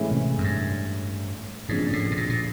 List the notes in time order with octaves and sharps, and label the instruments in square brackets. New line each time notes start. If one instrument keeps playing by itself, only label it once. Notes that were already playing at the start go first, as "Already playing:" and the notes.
Already playing: [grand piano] A2 E3 G#3 C#4 E4
[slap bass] C3
F#2
G2
[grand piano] F2 C#3 F3 A#3 D4 [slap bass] G#2
[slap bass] A2
B2
A#2
A#2